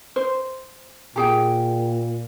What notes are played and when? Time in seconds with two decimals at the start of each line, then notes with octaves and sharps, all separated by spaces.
0.16 C5
1.16 A#2 G4 G#4 G5